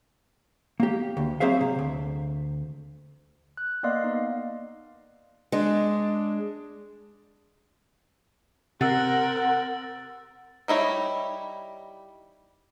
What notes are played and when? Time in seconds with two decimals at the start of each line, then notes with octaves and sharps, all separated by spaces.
0.80 A#3 G4
1.17 D2
1.40 F#3 C4 G#4 C5 E5 F5
1.61 C3
1.79 D2
3.57 F#6
3.83 A#3 B3 D5 D#5 F5 C6
4.04 D#4
5.52 G#3 D4
8.81 C3 C4 A#4 F#5 E6 A6
10.68 G3 D#4 E4 C#5